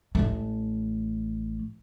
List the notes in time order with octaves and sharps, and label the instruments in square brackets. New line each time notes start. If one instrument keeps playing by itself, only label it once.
[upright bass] A1 A3